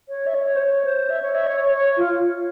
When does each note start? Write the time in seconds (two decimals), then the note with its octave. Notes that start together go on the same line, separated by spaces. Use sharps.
0.09 C#5
0.27 E5
0.34 C#5
0.56 C5
0.60 C#5
0.85 C5
1.10 E5
1.22 C#5
1.35 E5
1.47 C#5
1.61 C#5
1.73 C#5
1.97 F4